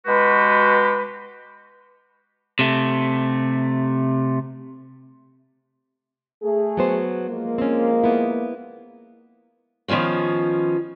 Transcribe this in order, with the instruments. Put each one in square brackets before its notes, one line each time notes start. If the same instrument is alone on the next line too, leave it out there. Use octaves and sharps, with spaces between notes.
[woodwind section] B2 G#3 F#4 G4 B4
[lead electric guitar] C3 A3
[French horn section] A3 G#4
[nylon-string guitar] F#3 B3 C5
[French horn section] F3 G#3 A#3
[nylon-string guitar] C4 C#4
B3 E4
[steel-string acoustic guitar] D#3 F3 B3 C#4 F4